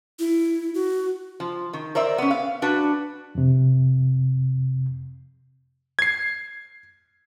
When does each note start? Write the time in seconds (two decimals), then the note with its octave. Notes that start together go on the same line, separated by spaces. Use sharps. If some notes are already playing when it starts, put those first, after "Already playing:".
0.19 E4
0.74 F#4
1.40 F3
1.73 D#3
1.95 A#4 C5 D5 E5
2.18 B3 C#4
2.31 F5
2.62 D4 F#4 B4
3.35 F2 C3
5.99 G#6 C7